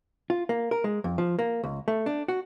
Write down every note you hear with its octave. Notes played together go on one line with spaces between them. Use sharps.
F4
A#3
A#4
G#3
F2
F3
A#3
C#2
A3
D4
F#4